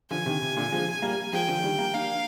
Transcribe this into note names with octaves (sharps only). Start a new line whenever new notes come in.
D3 F3 G#5
C3 D#3
C3
A#2 D3
F3 G#3
G3 A#3
F3 G#3 G5
D3 F3
D#3 G3
G3 A#3
A#3 D4 F5